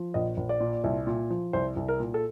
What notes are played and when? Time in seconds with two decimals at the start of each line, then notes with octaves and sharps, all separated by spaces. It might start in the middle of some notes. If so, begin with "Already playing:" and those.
Already playing: F3
0.14 A#1 D#5
0.37 A#1
0.49 D5
0.60 A#2
0.84 C2
1.07 A#2
1.30 F3
1.53 C2 C5
1.76 C2
1.88 A#4
2.00 A#2
2.14 A4